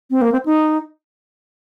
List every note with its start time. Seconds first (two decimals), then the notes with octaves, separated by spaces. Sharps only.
0.11 C4
0.22 A#3
0.32 C4
0.46 D#4